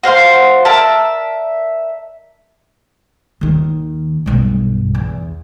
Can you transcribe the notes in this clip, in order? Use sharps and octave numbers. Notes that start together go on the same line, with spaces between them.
F#4 C5 F5 C6
A#4 D5 E5 A5
D#2 D#3
B1 G2
E2